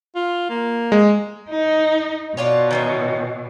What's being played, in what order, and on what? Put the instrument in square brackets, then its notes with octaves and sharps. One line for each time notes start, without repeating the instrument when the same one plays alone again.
[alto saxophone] F4
A#3
[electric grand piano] G#3
[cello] D#4
[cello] B2 [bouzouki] D4 F4 C#5
[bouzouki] D#3 E3 C#4